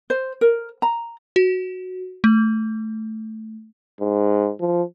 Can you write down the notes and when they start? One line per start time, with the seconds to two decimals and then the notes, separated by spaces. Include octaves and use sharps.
0.10 C5
0.41 A#4
0.82 A#5
1.36 F#4
2.24 A3
4.01 G#2
4.60 F3